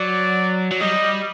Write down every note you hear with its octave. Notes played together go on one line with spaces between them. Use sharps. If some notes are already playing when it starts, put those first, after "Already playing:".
Already playing: F#3 D5
F#3
G3 D#5